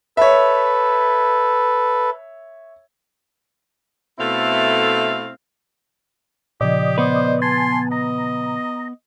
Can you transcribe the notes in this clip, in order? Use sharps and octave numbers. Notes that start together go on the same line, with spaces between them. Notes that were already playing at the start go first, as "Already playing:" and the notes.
A4 B4 C#5 E5
B2 A3 C4 E4 A4 F5
A#2 C#3 F3 G4 D5 D#5
B3 B4 C5
G#5 A5 C6
D#5 A#5